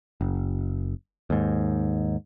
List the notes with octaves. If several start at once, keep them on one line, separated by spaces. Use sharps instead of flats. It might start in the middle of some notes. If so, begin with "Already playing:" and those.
F#1
D#2 G#2